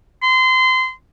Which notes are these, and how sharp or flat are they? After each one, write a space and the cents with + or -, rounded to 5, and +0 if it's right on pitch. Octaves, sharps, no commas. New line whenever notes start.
C6 -25